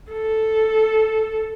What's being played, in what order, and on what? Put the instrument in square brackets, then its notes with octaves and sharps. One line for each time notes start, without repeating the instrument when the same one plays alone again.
[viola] A4